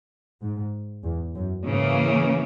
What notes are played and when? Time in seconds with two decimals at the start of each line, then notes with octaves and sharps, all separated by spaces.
0.42 G#2
1.04 E2
1.35 F#2
1.66 G#2 C#3 E3 A#3